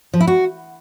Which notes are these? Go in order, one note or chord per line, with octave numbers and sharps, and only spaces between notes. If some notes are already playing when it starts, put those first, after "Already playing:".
F3
E4
F#4